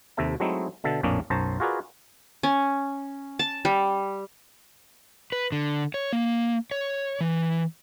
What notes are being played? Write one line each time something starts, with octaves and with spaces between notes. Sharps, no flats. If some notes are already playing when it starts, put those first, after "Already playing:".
D#2 C3 A4 E5 A5
F#3 G#3 A3 C4 D#4 E4
B2 D3 E5 A5
A#1 F2 A2 A#3 C#4 D4
B1 F#2 C5 C#5 A5 A#5
F4 F#4 G#4 A#4 B4 D5
C#4
A5
G3
B4
D3
C#5
A#3
C#5
E3